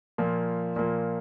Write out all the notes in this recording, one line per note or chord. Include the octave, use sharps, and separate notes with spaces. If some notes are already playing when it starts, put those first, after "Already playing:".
A#2 F3 A#3
A#2 F3 A#3